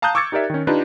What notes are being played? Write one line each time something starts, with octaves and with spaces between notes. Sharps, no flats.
F5 A5 A#5 D#6 F#6 G6
C#6 D6 E6 G#6 A6 C#7
D#4 G4 A#4 D5 E5
D#3 C#4
D4 D#4 F4 G4 B4